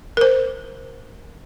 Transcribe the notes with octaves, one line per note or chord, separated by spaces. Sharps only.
A#4 C5